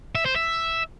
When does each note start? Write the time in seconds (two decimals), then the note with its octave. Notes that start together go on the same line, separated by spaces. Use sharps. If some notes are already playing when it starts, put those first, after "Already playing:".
0.15 E5
0.26 C5
0.36 E5